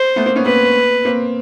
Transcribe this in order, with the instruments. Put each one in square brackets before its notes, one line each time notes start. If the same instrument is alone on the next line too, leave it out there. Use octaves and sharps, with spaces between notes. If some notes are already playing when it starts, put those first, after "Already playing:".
Already playing: [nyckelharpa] C5
[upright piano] A3 B3
A#3 C4
B3 C#4
[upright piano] A#3 C4 [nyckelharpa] B4
[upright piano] A#3 C4